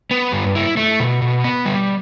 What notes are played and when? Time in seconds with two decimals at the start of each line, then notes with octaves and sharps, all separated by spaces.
0.11 B3
0.32 G2
0.55 E4
0.77 A3
1.00 B2
1.22 B2
1.44 B3
1.66 G3